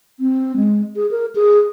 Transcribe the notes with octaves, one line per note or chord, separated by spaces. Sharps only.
C4
G#3
G#4
A#4
G#4